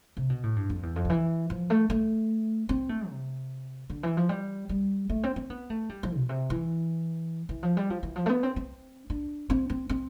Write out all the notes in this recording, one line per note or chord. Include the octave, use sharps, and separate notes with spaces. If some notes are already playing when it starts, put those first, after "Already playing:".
C3
B2
A2
G2
F2
E2
F2
D3
E3
F3
A3
A3
C4
A3
C3
D3
E3
F3
G3
G3
A3
C4
C4
B3
A3
G3
F3
B2
C3
E3
E3
F3
G3
F3
E3
F3
A3
B3
C4
C4
D4
C4
C4
C4